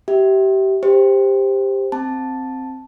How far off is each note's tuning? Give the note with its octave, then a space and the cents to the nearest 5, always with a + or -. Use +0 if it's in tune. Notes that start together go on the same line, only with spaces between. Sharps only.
G4 -25 E5 -10
G4 +10 C5 +0
C4 +0 A5 +0